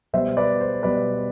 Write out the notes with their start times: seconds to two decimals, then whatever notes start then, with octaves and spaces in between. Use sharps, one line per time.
0.13 B2 G3 B3 C5 E5
0.37 B4 D5
0.60 C5
0.83 B2 G3 B3 B4 D5